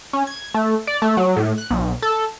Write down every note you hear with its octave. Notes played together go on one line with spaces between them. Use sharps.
C#4
G#6
A3
D5
A3
F#3
A2
F#6
B1
A4